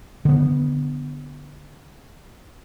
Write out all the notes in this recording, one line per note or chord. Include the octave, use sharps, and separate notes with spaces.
D3 B3